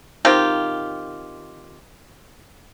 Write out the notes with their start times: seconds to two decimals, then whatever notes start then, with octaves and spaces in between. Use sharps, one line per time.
0.25 D#3 C4 F4 G4